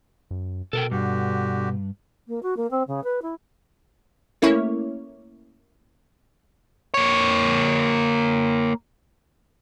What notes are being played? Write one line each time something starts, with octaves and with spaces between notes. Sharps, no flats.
F#2
B2 A4 A#4 G5
G2 D3 F#4 G4
A#3
F#4
A#3
C4
C#3
B4
E4
A3 A#3 C#4 E4 C#5
A#3 C#5